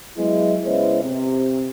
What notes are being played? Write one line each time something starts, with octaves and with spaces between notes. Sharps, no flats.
F#3 G#3 B3 E4
C#3 G#3 B3 E4 C5 C#5
C3